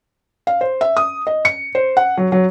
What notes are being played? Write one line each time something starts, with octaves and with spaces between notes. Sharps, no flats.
F5
C5
E5
D#6
D#5
C#7
C5
F#5
F#3
F#3